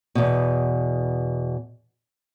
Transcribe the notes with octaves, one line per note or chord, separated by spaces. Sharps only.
E2 B2